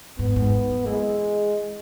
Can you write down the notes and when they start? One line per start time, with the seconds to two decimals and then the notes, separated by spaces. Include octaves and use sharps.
0.19 G#2 B3
0.36 G#2
0.70 F#3
0.86 E3 G#3